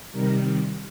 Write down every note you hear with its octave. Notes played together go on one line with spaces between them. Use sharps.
C3 D#3 G3 A#4